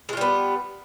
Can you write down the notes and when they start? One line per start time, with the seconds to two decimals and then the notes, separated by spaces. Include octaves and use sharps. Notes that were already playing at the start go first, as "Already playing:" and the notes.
0.09 G#3
0.13 F4
0.17 G3
0.21 B3